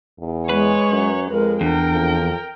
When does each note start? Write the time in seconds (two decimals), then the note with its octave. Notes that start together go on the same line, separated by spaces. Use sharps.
0.19 E2
0.49 G#3 B4 C#5
0.91 F#2
1.31 F2 G#3 A#4
1.61 E2 D4 A#4 G5
1.90 F2